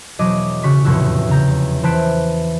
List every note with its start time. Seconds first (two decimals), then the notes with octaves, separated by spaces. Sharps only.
0.19 E1 F#3 D#5 D6
0.63 C#3 F#4 C#6 B6
0.85 F1 E2 A2 F#4 E6
1.29 C#3 A#5 G6
1.83 E3 C5 A5 F#6 B6 D7